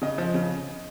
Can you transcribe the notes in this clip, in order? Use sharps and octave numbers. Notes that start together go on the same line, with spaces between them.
C#3 D#5
F3
C#3